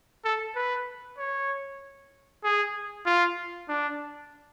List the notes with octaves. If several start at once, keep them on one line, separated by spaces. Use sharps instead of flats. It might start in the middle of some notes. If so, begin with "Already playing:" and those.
A4
B4
C#5
G#4
F4
D4